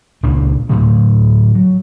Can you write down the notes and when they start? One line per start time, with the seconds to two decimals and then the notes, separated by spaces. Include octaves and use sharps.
0.23 C#2 A#2 A#3 D4
0.69 A2 D3 F#3 A3
1.55 F#3